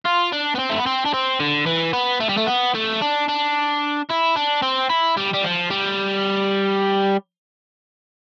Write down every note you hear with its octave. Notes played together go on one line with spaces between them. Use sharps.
F4
D4
B3
C4
A3
B3
C4
D4
C4
D3
E3
B3
A3
G3
A3
B3
A3
D4
D4
E4
D4
C4
E4
G3
G3
F3
G3